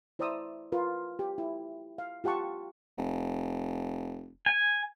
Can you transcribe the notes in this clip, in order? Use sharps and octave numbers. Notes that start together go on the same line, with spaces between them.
E4 C5 D5 A#5 D#6 E6
F4 A#4 B4
G4
E4
F5
F4 G4 F#5 A5 C#6
F1
G#5